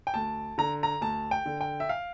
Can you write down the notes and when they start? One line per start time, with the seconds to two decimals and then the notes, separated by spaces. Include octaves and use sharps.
0.07 G5
0.14 D2 A5
0.58 D3 A#5
0.83 A#5
1.01 D2 A5
1.31 G5
1.46 D3
1.61 G5
1.80 E5
1.89 F5